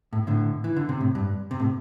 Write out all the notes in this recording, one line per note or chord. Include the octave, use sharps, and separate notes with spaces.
A2
A2 D3
E3
D3
C3
A2
G2
C3
A2